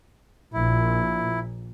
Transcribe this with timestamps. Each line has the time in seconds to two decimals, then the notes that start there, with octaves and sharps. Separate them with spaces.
0.53 A#1 A#2 E4